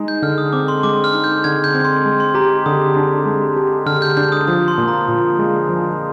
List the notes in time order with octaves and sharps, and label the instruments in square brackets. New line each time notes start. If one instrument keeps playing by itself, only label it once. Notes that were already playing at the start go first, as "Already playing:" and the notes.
Already playing: [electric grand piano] G#3 D#4
[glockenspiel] G6
[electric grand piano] D3 [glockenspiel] F6
[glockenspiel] D#6
[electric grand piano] C4 [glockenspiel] D6
[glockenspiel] C6
[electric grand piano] G#3 [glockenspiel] D6
[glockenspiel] F6
[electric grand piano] D#4
[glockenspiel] G6
[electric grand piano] D3 [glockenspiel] G#6
[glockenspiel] G6
[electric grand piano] C4
[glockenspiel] C6
[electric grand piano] G#3
[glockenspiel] C6
[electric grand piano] G4 [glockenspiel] A#5
[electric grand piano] D3 [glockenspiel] D#6
[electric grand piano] D4
G#3
G4
[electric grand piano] D3 [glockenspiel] F6
[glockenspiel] G6
[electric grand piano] D4 [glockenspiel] G6
[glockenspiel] D#6
[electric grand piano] F3 [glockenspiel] D#6
[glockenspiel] C6
[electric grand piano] A#2
[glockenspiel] A#5
[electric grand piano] A#2
G#3
F3